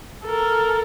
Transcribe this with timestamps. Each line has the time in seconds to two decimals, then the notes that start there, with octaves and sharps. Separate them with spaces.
0.24 A4 A#4